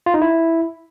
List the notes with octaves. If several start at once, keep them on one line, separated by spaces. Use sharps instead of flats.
F4
D#4
E4